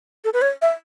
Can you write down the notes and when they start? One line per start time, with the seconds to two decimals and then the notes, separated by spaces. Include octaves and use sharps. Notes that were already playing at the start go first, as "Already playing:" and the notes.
0.25 A4
0.33 B4
0.42 C#5
0.62 E5